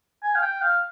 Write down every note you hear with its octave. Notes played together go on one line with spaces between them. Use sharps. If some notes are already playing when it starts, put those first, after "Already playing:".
G#5
F5
G5
F5